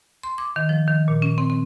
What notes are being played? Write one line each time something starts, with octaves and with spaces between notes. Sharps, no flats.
C6
D6
D#3
F3
D#3
A#2
C#4
C4
C4